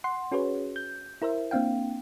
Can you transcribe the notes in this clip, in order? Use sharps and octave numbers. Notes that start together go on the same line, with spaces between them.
F#5 C6
C#4 F#4 G#4 B4 C#5
G6
E4 A#4 C5 E5
A#3 C4 D4 F5 G5